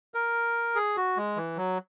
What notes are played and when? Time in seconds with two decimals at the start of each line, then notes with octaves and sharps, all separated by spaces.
0.14 A#4
0.75 G#4
0.97 F#4
1.17 G#3
1.36 E3
1.57 F#3